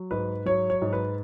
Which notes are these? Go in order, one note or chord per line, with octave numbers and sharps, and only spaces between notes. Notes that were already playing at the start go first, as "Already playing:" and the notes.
Already playing: F#3
G#2 B4
F#3 C#5
C#5
G#2
B4